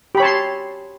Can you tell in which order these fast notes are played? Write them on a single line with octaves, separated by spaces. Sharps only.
G4 B5 C#5 A5 C6